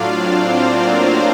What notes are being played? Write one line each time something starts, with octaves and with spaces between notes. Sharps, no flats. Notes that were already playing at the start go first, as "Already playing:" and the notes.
Already playing: A2 F#3 D4 F4 D5 F5
C4 C5
A#3 A#4